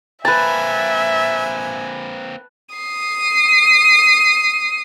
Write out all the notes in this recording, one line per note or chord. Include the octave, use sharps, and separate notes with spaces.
A#3 C4 B4 E5 G#5 A5
D#6 C7